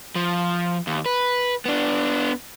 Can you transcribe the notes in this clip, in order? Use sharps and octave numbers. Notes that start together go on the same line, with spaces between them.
F3
D#2
B4
B3 D4